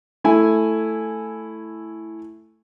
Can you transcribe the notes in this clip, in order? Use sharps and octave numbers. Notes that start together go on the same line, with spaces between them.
A3 E4 G#5